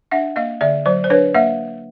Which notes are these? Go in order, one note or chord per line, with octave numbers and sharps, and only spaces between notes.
D4 E5 F#5
A#3 D#5 F5
D3 D5 E5
F#3 C5 D5
C5
D4 B4 C#5
A#3 E5 F#5